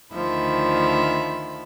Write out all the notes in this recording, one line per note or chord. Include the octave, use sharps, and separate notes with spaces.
D2 D#3 F3 E5 B5